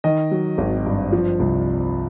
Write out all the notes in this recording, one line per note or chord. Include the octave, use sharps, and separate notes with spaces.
D#3 D#5
F#3
G#1
G2
F3
C2